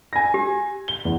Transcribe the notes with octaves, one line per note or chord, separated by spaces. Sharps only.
G#5 A#6
G4
G7
E2